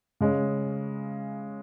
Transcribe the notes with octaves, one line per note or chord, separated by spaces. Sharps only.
C#3 G#3 C#4